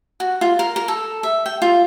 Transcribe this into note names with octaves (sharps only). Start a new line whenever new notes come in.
F#4
F4
A#4
A#4
A4
E5
G5
F4